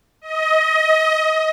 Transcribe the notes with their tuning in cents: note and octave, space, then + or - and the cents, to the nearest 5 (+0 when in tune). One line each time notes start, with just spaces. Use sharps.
D#5 +25